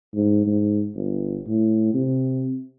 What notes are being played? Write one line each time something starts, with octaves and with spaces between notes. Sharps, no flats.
G#2
G#2
G1
A2
C3